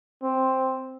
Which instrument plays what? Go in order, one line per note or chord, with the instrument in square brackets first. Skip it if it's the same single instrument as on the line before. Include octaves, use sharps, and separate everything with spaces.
[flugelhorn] C4